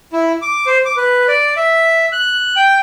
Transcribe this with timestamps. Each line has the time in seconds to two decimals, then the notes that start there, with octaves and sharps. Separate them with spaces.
0.13 E4
0.42 D6
0.66 C5
0.85 D6
0.97 B4
1.28 D5
1.57 E5
2.12 F#6
2.56 G5